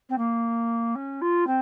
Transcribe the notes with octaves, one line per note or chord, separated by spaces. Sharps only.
C4
A#3
C#4
F4
C4